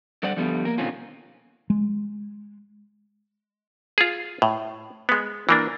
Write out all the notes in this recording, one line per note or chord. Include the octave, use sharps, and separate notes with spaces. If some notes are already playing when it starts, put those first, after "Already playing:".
D3 G3 C5 D5 F#5
D3 F3 G3 A3 B3
A#3 A#4
B2 D3 D#3 C4 C#4 F4
G#3
F4 G#4
A2
G#3 B3
E3 A#3 D4